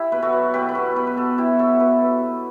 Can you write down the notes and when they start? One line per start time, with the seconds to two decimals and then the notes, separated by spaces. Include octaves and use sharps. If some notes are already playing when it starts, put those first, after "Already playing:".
Already playing: E4 G4
0.12 B2 B4
0.22 F#4 A4
0.33 F#3
0.54 B2 G4 B4
0.69 B4
0.75 B2 F#4 A4
0.96 B2 G4 B4
1.07 B4
1.16 B2 F#4 A4
1.38 F#3 E4 G4
1.59 F#3 F#4 A4
1.80 B2 G4 B4
2.01 B2
2.22 B2